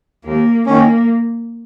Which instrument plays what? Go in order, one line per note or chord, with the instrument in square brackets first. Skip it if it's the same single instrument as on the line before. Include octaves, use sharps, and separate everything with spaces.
[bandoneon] D#2 [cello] A#3
[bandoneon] D#3 C#4 [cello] A#3